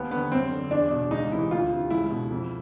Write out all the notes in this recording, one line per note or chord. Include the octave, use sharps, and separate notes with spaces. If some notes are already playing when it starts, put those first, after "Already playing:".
Already playing: D#2 B3
D3 B3
F#2 C4
D3
E2 D4
B2
C#2 D#4
C3 E3 E4
D2 F4
C3 E3
C#2 E4
B2
F2